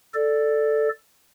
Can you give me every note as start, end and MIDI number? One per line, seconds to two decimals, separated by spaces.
0.14 0.89 69
0.14 0.89 74